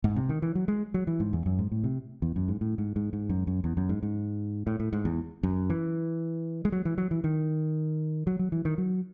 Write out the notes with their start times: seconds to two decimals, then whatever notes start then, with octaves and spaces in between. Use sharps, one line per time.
0.04 G#2
0.16 C3
0.29 D#3
0.42 E3
0.55 F#3
0.68 G#3
0.94 F#3
1.07 E3
1.20 G#2
1.33 E2
1.46 F#2
1.59 G#2
1.71 A2
1.84 C3
2.22 E2
2.36 F#2
2.48 G#2
2.61 A2
2.78 G#2
2.96 G#2
3.13 G#2
3.29 F#2
3.47 F#2
3.64 E2
3.77 F#2
3.89 G#2
4.03 G#2
4.67 A2
4.80 A2
4.93 G#2
5.05 E2
5.43 F#2
5.70 E3
6.65 G#3
6.72 F#3
6.85 E3
6.98 F#3
7.11 E3
7.24 D#3
8.27 F#3
8.39 F#3
8.52 E3
8.65 D#3
8.78 F#3